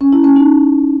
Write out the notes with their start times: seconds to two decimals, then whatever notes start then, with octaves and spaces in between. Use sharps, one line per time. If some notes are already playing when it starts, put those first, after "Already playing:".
0.01 C#4
0.13 E4
0.24 C#4
0.36 D#4